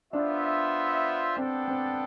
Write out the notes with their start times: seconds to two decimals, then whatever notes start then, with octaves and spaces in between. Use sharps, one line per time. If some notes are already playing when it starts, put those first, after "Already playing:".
0.13 B3 D4 F4 C5 E5
1.37 B3 C4 D4 A4 D5 G5
1.68 C4